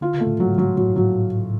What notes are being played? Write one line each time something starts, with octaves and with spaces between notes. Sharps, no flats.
D3 F4
C#3
A3
A2
G#2 F#3
F#3
A2 F#3
G#2
F#3
A2